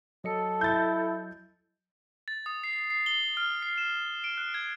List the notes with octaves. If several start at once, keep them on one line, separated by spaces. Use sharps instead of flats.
F#3 A4 D#5 C#7
E4 G6 A6
A6
D#6
C7
C7
G7
F6
C7
E7
D7
F#6
G#6